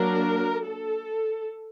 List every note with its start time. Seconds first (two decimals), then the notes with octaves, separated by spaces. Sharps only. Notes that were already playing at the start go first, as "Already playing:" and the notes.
Already playing: F#3 A#3 D4 A#4
0.65 A4